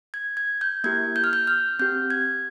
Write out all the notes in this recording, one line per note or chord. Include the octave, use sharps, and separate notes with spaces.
G#6
G#6
G6
A#3 E4 G4 G#6
G6
F6
G6
F6
C4 G4 G6
G#6